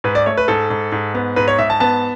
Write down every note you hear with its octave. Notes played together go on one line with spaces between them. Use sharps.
G#2 B4
D5
A3 C#5
B4
G#2 A4
G#2
G#2
B3
G#2 B4
C#5
G#2 E5
A5
B3 A5